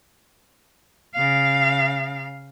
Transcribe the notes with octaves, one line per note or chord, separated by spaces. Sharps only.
C#3 F5